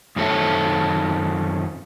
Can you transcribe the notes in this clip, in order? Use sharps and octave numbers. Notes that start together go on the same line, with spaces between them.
F#2 D#3 C4 A4 C#5 E5